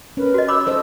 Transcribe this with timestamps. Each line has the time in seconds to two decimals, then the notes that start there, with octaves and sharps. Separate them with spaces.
0.17 C#4 A#4 B4
0.34 F#4 D#5
0.48 C#5 B5 D6 E6
0.67 A4 C5 D#5